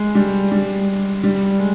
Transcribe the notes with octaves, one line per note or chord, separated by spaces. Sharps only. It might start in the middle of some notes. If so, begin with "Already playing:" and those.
Already playing: G#3
G3
G3
G3
G#3